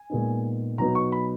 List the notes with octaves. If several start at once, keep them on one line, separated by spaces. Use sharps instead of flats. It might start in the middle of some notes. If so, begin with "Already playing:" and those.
Already playing: G#5
A#2 G#3 B3 D#4
B2 F#3 B3 D#4 A#5
C#6
B5